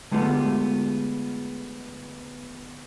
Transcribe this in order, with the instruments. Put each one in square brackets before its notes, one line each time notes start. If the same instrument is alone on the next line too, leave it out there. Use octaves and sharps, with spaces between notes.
[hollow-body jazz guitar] D3 G#3 A3 B3 F4 G4